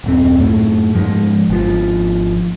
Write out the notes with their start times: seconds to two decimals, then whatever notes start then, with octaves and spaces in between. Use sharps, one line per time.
0.04 D#1 F#2 C4
0.40 F#2 A2 A3
0.93 G#2 F3 G#3
1.49 G#1 F3